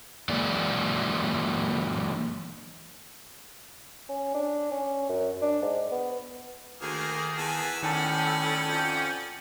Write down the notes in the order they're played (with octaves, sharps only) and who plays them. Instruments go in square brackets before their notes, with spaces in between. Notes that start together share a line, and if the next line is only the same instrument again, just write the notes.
[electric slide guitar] E3 F#3 G#3 A#3 D5
[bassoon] C#4
D4
C#4
F#2
D4
G#2
B3
[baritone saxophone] D2 [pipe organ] D#3 G#4 [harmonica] A#3 G#5
[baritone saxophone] E2 [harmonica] B4 G#5 A5
[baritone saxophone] A2 [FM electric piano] D#3 A5 [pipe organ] C#4 F#5 [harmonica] D5 G5
[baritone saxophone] F2